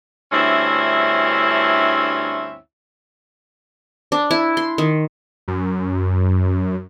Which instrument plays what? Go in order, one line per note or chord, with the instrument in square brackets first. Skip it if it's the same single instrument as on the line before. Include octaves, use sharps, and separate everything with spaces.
[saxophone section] D2 G2 C4 C#4 E4 E5
[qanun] D4
E4
C6
D#3
[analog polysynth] F#2